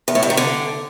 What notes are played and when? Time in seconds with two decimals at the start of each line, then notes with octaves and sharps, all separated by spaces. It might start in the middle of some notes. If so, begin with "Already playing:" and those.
0.08 E2
0.15 A2
0.23 G2
0.30 D#3
0.37 D3